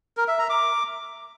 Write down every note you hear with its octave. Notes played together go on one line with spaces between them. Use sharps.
A#4
E5
A#5
D6